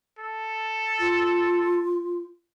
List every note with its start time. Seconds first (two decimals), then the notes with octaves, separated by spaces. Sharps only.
0.19 A4
1.00 F4